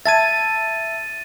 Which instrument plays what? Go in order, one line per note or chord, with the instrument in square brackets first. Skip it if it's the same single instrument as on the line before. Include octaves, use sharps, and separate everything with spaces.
[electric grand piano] E5 A5 G#6 [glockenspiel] A6 D#7